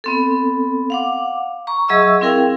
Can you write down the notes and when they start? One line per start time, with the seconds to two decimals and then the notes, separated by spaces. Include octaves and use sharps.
0.04 B3 C4 A4
0.90 F5 F#5 D6
1.67 A#5 C#6
1.88 F#3 G#4 D#5 E5 C#6 E6
2.21 C4 E4 G#4 A#4 F5 G5